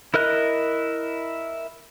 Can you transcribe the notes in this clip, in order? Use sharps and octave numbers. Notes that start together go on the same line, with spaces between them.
E4 A#4 D#5 F#6